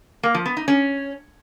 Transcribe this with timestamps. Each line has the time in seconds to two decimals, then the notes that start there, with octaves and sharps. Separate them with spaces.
0.23 A#3
0.35 F3
0.46 B3
0.57 D#4
0.68 C#4